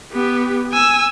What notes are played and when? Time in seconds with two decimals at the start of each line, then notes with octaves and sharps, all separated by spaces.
0.13 B3 G4
0.72 G#5 E6